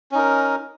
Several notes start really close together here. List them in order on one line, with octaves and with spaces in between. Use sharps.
C#4 D#4 A#4